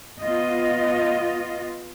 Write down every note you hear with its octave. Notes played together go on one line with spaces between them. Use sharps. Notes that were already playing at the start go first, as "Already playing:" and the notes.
B3 F4 D#5